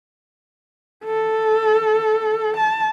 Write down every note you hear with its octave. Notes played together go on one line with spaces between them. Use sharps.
A4
A5